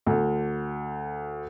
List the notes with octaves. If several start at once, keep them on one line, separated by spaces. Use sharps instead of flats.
D2